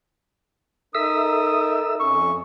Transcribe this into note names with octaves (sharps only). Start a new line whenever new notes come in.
D#4 A4 A#4 E5 D#6 E6
F2 C#4 C#6